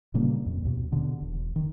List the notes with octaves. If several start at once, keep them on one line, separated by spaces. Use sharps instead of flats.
A#2 C#3 G3 A#3
F2
D#2 B2
B2 D3 B3
E1
D#3